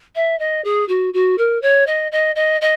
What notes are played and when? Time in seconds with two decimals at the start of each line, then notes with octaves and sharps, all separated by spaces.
0.15 E5
0.39 D#5
0.64 G#4
0.88 F#4
1.13 F#4
1.38 A#4
1.62 C#5
1.87 D#5
2.11 D#5
2.35 D#5
2.61 D#5